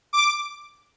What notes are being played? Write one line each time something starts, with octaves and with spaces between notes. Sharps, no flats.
D6